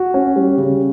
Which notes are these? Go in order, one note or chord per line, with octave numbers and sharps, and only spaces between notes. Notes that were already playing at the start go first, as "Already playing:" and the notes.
Already playing: F#4
C#4
G3
C#3